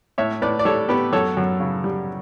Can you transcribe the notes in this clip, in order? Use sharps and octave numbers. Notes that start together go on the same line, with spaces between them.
A2 C#5 E5
A2 B4 D5
D5
G3 A4 C#5
B3 G4 B4
F#2 A4 C#5
F#2
C#3
G3